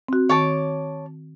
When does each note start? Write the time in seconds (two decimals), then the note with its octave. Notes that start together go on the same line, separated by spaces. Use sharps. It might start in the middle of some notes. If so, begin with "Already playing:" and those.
0.08 C4 F#4
0.29 D#3 C#5 A5 D6